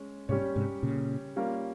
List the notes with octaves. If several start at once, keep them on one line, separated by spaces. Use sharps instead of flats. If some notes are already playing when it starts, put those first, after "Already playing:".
Already playing: G#3 C#4
G#2 C3 G3 C#4 G4 C#5
G#2 C3
A#2 C#3
G3 A#3 C#4 F4 A#4